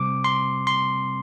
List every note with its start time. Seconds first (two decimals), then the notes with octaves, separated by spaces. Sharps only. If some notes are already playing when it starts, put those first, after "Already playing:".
Already playing: C3 G3 C4 D6
0.24 C6
0.67 C6